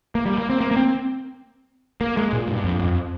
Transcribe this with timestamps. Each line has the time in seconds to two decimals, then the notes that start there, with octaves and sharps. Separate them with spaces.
0.15 A#3
0.26 G3
0.38 A#3
0.50 C4
0.61 A#3
0.71 A#3
0.77 C4
2.01 A#3
2.17 G#3
2.33 A#2
2.48 G2
2.64 F2
2.79 F2